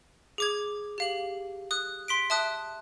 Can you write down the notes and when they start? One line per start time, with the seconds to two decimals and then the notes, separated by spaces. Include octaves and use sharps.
0.38 G#4 D6 G#6
0.98 G4 F5 F#7
1.71 D#6 F#6
2.08 C6 B6 D7
2.30 E5 A5 D#6 F#6